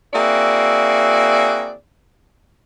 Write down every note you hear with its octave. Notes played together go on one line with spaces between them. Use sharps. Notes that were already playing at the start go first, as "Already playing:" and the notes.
A#3 C4 E4 F#4 G#4 D5